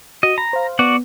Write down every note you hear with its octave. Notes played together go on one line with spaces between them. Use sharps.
F#4 D#5
A#5 B5
C5 F5
B3 F#4 D5 F#5